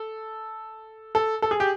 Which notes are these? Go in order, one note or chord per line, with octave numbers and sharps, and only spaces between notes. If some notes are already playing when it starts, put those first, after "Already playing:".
Already playing: A4
A4
A4
G#4
G4